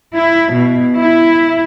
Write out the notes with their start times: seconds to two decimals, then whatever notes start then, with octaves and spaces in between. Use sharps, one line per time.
0.16 E4
0.54 B2
1.00 E4